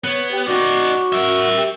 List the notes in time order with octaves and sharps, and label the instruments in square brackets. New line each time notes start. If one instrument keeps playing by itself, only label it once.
[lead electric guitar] B3 [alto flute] C#5
[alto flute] G4
[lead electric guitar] D#4 D5 [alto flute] F#4
[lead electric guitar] A#4 E5
[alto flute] G4